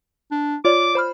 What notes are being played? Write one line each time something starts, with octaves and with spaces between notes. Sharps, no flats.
D4
F4 C#5 D5 D6
C5 B5 F6